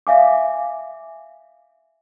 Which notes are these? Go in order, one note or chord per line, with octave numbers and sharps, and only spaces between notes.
E5 F5 G#5 D6